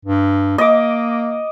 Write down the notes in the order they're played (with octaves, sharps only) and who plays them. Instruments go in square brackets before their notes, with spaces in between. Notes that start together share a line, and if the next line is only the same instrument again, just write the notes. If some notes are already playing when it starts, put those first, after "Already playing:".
[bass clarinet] G2
[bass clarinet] A#3 [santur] D#5 D6